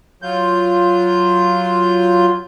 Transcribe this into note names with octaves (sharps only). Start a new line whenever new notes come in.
F#3 F4 G6